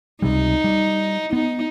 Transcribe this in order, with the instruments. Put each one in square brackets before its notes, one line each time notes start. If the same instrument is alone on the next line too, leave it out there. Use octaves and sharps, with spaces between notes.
[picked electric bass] C#2 C3 G3 [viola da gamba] D#4
[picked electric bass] G3
[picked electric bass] B3 [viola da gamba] D#4